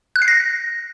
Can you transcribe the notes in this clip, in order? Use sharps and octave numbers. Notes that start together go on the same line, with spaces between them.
F#6
C7
A#6